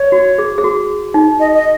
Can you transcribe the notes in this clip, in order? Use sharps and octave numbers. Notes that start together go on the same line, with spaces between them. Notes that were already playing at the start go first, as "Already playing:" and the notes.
Already playing: C#5
F#4
G#4
G#4
F#4
D#4
D#5
D#5